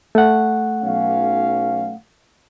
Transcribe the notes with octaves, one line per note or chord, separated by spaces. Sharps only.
A3 F#5
B1 C#4 F5